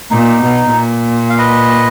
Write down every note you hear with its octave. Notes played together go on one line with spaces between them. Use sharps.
A#2 D#4
B2
A#2
F5
B4 D#5